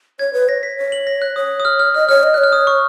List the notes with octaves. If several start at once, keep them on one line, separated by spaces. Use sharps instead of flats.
C#5 G#6
B4
C#5 A#6
B6
C#5
F#7
A#6
F#6
C#5 D#6
D#6
F6
F6
D#5 F6
C#5 F6
D#5
C#5 F#6
F6
D#6
C#6